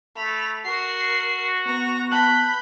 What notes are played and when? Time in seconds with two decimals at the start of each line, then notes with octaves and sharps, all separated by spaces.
0.16 A3 B5 F7
0.65 F#4 A#4 C7
1.67 B3 A#5
2.11 A5 B5 F#6 G6 F#7